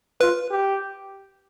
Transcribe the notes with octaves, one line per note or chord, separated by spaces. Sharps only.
F4 B4
G4